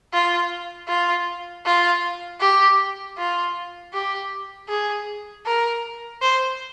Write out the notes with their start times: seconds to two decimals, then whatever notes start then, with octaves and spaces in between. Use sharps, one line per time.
0.13 F4
0.88 F4
1.66 F4
2.40 G4
3.18 F4
3.94 G4
4.69 G#4
5.46 A#4
6.22 C5